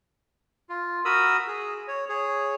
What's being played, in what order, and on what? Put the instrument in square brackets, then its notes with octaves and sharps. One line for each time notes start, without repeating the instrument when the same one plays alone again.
[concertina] F4
F#4 A#4 B5 D#6 E6
G#4
C#5
G#4 C#5